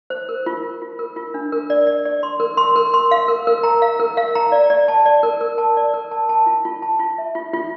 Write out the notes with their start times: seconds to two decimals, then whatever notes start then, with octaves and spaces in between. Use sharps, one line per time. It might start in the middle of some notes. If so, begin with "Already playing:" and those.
0.10 C5
0.29 A#4
0.46 F4
0.63 A#4
0.82 F4
0.99 A#4
1.16 F4
1.34 D4
1.52 A#4
1.70 D5
1.87 D5
2.05 D5
2.23 C6
2.40 A#4
2.57 C6
2.76 A#4
2.94 C6
3.11 F5
3.28 A#4
3.47 A#4
3.63 A#5
3.82 F5
4.00 A#4
4.17 F5
4.35 A#5
4.52 D5
4.70 D5
4.88 A5
5.06 D5
5.23 A#4
5.41 A#4
5.58 A5
5.77 D5
5.94 A#4
6.11 A5
6.29 A5
6.46 F4
6.65 F4
6.82 A5
7.00 F4
7.18 E5
7.35 F4
7.54 F4